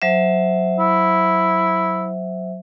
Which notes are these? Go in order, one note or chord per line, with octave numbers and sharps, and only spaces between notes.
F#3 C5 E5
E4